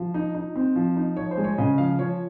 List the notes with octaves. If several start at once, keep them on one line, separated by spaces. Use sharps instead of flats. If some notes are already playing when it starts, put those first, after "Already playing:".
Already playing: F3
D#4
D#4
C4
F3
D#4
F3 C#5
C5
G#3
C#5
C#3 D#5
F3 F5
F3 C#5